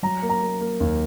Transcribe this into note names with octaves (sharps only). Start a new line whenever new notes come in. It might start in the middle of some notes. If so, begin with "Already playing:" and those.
F#3 A#5
A#3
A#5
A#3
A#3
D#2